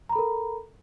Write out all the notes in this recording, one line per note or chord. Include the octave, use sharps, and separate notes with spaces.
A4 A#4 A#5 B5